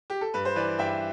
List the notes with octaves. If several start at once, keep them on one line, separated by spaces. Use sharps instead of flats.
G4
A4
G2 B4
C5
E3 B4 D5
G2 E5 G5